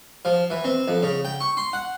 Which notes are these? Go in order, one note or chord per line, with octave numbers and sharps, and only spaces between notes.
F3
E3
C4
F2
C#3
G5
C#6
C6
F#5